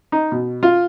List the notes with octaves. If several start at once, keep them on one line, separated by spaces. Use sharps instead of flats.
D#4
B2
F4